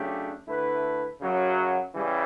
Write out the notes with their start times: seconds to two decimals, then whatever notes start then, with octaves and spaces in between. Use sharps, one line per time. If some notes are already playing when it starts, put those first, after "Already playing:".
Already playing: C#3 F#3 A3 D4 G4
0.46 D3 A3 E4 B4
1.20 F#2 C#3 F#3
1.93 C#3 E3 G3